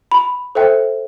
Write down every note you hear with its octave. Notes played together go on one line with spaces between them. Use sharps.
B5
A4 C5 E5 G5